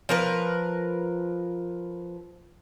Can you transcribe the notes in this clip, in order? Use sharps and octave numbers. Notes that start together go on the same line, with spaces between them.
F3 A#4 B4